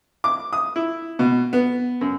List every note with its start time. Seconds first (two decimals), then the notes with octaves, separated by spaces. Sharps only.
0.24 D6
0.53 D#6
0.76 E4
1.19 B2
1.53 B3
2.01 F#2